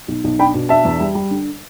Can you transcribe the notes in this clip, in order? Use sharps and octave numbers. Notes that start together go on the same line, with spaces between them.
B1
B1
D4 G5 B5
B2
D4 E5 A5
E2
G3
G3
D3